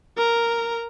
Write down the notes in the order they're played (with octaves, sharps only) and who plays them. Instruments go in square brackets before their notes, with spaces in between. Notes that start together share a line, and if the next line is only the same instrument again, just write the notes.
[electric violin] A#4 A#5